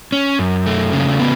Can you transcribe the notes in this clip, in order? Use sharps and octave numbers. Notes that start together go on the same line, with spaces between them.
C#4
F#2
A3
C#3
B3